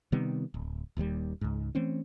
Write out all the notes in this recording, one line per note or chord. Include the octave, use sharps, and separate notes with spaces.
C3 D#3 G3 B3
D1
D#1 D#2 A2 G3
C#2 G#2
E3 A3 C4 C#4